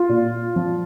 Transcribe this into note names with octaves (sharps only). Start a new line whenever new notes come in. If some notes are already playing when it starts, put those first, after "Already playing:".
Already playing: F4
A#2
F3